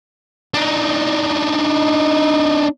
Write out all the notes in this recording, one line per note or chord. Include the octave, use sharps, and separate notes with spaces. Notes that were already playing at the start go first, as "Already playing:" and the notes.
D4 D#4